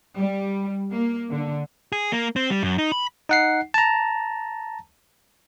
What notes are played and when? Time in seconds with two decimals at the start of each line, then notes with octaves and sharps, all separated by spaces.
0.17 G3
0.93 A#3
1.31 D3
1.92 G#4
2.12 A#3
2.36 C4
2.50 G3
2.63 F#2
2.78 D#4
2.92 B5
3.29 D#4 F#5 C7
3.74 A5 A#5